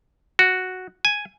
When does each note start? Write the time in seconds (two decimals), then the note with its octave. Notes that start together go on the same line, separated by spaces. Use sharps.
0.39 F#4
1.05 G#5